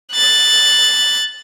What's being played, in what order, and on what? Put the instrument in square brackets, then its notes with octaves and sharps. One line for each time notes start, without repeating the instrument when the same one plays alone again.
[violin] F#6 A6